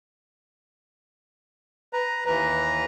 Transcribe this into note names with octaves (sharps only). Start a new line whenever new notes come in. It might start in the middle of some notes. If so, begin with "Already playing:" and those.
B4 A#5
D#2 E3 B4 A#5